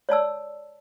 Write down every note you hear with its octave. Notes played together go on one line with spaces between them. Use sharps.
C#5 D5 A5 E6